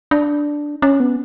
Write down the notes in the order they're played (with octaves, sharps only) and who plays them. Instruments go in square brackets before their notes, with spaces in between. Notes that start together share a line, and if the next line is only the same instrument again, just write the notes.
[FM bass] D4
C#4
B3